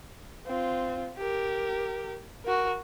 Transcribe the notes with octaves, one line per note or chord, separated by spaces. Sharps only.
C4 F4
G4 A#4
F#4 A#4